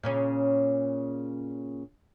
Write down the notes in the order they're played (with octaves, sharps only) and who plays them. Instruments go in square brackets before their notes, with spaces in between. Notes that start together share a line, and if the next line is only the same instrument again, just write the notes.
[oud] A#2 C#3 C#4